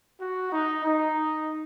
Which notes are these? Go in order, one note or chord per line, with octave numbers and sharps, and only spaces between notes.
F#4
D#4
D#4